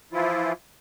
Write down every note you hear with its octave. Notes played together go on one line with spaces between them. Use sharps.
E3 F3 E4 F4